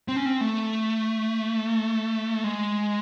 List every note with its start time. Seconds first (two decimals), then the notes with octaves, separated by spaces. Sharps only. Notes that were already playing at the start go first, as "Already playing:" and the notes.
0.08 C4
0.16 C#4
0.26 C4
0.41 A3
2.44 G#3